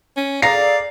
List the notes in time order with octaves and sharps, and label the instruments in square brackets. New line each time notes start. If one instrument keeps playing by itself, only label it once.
[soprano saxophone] C#4
[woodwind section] G#4 A4 D5 [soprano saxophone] F5 [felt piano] A#5 A#6 C7